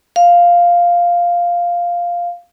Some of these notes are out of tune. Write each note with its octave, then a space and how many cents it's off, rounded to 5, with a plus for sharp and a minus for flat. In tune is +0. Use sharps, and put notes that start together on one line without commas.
F5 +0